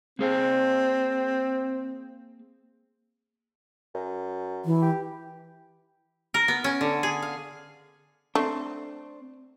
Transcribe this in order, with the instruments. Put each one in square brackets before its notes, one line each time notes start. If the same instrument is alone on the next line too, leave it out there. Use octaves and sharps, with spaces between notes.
[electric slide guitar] A#3 G#4 F5 [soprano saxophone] C4
[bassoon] F#2
[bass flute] E3
[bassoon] G4
[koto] A#4
B3
C#4
D3
G#4
F5
[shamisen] A3 [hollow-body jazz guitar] C4 D4